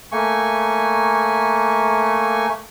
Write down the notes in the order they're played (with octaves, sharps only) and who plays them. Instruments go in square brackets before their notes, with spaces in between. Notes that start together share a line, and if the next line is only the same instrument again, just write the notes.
[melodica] A3 A#3 G#5 C#6